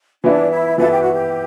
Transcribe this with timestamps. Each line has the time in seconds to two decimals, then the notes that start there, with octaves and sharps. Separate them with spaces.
0.24 E3 B3 D4 E4
0.50 E4
0.78 E3 B3 E4 A4
0.90 G4
1.01 F#4
1.13 G4